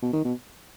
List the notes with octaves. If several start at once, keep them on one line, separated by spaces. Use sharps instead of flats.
B2
D#3
B2